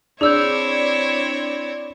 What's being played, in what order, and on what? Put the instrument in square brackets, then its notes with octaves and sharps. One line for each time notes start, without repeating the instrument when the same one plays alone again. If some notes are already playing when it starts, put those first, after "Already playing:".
[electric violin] C4 C#5 [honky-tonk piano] D4 [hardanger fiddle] E4 [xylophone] G#4 E6 G6